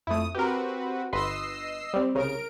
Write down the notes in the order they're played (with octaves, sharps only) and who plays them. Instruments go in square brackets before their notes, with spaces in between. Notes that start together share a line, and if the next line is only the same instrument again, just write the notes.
[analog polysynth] F2 D#6 [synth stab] A3 E4
[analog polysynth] C4 F#4 B4 [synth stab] G4 A#4
[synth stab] G1 B4 C6 [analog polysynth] D#5 E6 C7
[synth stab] G3 C4
[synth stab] C2 C#3 [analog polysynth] A#4 D7